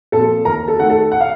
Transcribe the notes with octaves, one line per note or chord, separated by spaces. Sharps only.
A#2 F3 C4 A4 A5
D#2 A#4 A#5
A4 A5
D#3 A3 F#5
A4 A5
F#5
F5